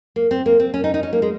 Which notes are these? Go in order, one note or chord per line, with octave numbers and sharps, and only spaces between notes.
A#3
C4
A#3
C4
C#4
D#4
D#4
C#4
A#3
G#3